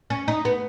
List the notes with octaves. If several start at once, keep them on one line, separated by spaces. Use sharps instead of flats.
C#4
D#4
B3